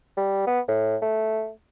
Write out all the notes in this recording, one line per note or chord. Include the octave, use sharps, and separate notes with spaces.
G3
B3
A2
A3